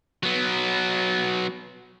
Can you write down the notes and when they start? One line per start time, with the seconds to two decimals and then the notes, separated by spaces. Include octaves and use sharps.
0.23 F#3 B3